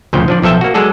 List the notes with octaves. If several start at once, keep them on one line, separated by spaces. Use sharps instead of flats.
D2 A#2 C#3 F3 G5
F3 D4 D5
B1 F3 A4 E5 G5
A#3 F#4
F#3 G#3 G#4 A4 D5